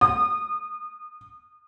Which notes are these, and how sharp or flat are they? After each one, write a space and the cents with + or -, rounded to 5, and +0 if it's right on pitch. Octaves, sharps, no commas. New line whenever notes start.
D#6 -30